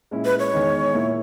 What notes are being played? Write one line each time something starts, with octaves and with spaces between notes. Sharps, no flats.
A#2 G#3 C#4 E4
B4
C#5
E2 D#3 G#3
A#2 A#3 E4